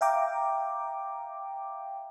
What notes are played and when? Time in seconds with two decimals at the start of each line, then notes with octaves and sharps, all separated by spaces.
0.01 E5 F5 G5 A#5 D6